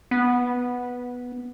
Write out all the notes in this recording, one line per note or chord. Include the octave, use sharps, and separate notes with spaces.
B3